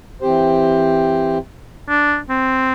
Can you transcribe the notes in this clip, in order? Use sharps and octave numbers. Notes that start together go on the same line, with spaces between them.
E3 C4 G4 C5
D4
C4